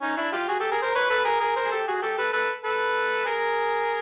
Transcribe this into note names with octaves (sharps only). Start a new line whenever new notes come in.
C#4 D#4
D4 E4
F4 G4
F#4 G#4
G4 A4
G#4 A#4
A#4 C5
B4 C#5
A4 B4
G#4 A#4
G#4 A#4
A#4 C5
G#4
G4 A4
F#4 G#4
G4 A4
A4 B4
A4 B4
A4 B4
G#4 A#4